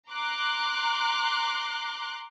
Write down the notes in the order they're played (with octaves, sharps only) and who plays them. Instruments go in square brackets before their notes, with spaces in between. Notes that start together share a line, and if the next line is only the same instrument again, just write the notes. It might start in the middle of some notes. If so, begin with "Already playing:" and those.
[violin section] A#5 C6 D6 F#6